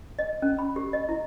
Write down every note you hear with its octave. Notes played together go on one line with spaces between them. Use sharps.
D#5
C#4
B5
G4
D#5
E4